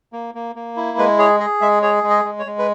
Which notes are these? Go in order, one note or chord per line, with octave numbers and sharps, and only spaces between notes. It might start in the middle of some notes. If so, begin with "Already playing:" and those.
A#3
A#3
A#3
E4
G#3 B4
G#4 C#5
G#4 D#5
G#3 E5
G#4 C#5
G#3
D#5
G#3
C#5
G#3
B4